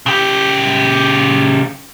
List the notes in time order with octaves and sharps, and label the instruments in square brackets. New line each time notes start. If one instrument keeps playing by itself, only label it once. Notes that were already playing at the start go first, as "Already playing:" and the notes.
[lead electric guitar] C#3 G4